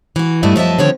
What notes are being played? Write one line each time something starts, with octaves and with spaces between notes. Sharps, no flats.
E3 F#4
G2 G3 A3 E4 D#5
F#2 F3 D#5 E5 A5
D3 D#3 F3 C4 C#5